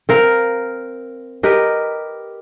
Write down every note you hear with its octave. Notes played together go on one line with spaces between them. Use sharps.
C4 A#4 F5
G4 A#4 B4 D#5